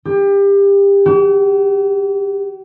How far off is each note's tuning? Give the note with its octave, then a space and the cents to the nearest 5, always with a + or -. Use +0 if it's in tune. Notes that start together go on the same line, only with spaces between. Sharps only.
G4 +25
G4 -45